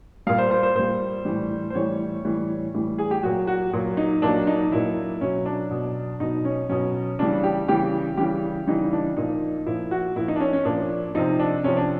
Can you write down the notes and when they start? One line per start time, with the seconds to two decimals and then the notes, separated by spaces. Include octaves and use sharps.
0.27 A#2 G3 F5
0.38 C5
0.51 C5
0.63 C5
0.76 A#2 G3 C5
1.25 A2 E3 G3
1.70 C5
1.75 A2 E3 G3 C#5
2.24 A2 E3 G3
2.74 A2 E3 G3
2.98 G#4
3.11 G4
3.23 A#2 F#3 F#4
3.47 F#4
3.73 A#2 F#3
3.97 D#4
4.22 A#2 F#3 D4
4.47 D#4
4.72 A#2 F#3 E4
5.21 B2 F#3 C#4
5.46 D4
5.71 B2 F#3
6.20 B2 F#3 D#4
6.45 C#4
6.69 B2 F#3 C#4
7.19 C#3 E3 G3 D4
7.44 G4
7.68 C#3 E3 G3 G4
8.17 C#3 E3 G3 G4
8.67 C#3 E3 G3 D#4
8.93 D4
9.17 A#2 F3 D#4
9.66 A#2 F3 E4
9.91 F#4
10.16 A#2 F3 E4
10.28 D#4
10.36 D4
10.40 C#4
10.53 C#4
10.65 A#2 F3 D4
11.15 C3 F3 D#4
11.39 D4
11.64 C3 F3 C#4
11.77 D4